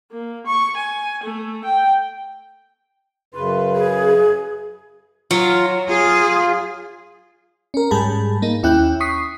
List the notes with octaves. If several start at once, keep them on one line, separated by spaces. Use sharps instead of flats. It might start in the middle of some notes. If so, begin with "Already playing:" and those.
A#3
C#6
G#5
A3
G5
F#2 C#3 B4 C6
G#4
F#3 F4
F4 G#4
C#4 A#4
G#2 G3 G#4 A5 B5
A#3 D#4
D#2 C#4 E4 G5 F#6 G6
C#6 D#6 B6 C7